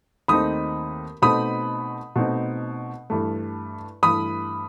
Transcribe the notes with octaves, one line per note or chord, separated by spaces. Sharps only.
D#2 D#3 A3 C4 D#4 B5 D#6
B2 A3 C4 D#4 B5 D#6
B2 A3 C4 D#4
G2 E3 A3
G2 E3 A3 B5 D#6